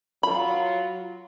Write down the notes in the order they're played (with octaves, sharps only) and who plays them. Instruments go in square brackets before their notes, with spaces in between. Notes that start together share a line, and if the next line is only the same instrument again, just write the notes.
[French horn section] F#3 F4 [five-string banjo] B5